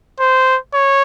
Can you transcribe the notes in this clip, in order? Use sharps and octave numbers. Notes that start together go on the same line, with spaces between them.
C5
C#5